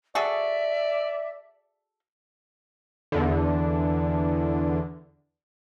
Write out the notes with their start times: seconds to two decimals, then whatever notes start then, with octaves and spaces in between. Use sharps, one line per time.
0.15 F#4 G#4 A4 D5 E5
3.12 E2 D3